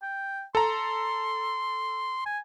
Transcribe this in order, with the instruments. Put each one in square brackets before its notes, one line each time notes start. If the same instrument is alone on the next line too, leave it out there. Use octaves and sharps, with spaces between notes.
[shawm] G5
[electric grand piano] A4 A#5 [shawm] C6
[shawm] G#5